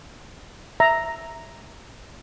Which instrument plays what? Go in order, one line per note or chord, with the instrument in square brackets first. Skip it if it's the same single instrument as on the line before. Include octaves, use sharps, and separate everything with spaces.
[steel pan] E5 A#5